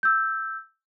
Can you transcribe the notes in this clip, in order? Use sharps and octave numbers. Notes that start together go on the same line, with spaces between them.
E6 G6